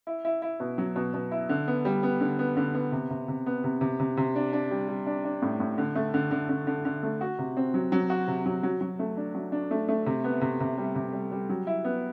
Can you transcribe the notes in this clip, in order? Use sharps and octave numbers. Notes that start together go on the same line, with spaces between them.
E4
E4
E4
B2
F#3
B2
B2
E4
D3
B3
G3
B3
D3
B3
D3
B3
C3
C3
C3
B3
C3
C3
C3
C3
D4
D4
G3
G3
D4
D4
A2
A2
D3
A3
D3
D3
D3
D3
D3
A3
F#4
C3
C4
F#3
F#3
F#4
C3
F#3
F#3
F#3
A3
D4
F#3
D4
A3
A3
C3
B3
C3
C3
G3
C3
G3
G3
F#3
E4
B3